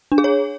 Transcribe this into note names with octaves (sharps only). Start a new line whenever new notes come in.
D4
G#4
C#5